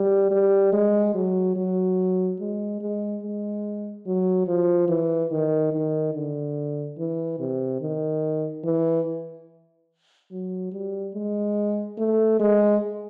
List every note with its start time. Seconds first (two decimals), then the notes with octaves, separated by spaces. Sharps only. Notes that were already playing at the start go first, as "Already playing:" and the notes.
Already playing: G3
0.31 G3
0.73 G#3
1.14 F#3
1.56 F#3
2.40 G#3
2.81 G#3
3.23 G#3
4.06 F#3
4.47 F3
4.89 E3
5.31 D#3
5.72 D#3
6.14 D3
6.98 E3
7.39 C3
7.81 D#3
8.64 E3
10.31 F#3
10.72 G3
11.14 G#3
11.98 A3
12.39 G#3